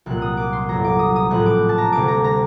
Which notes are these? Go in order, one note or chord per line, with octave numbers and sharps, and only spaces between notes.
C2 A#2 F#3 A#3 F#6
D#6
D6
C6
G1 G2 F#3 A#5
D6
D#6
D#6
A#1 A2 A3 C4 F#6
D6
A5
A#5
D2 C3 G3 A#3 D6
A#5
A#5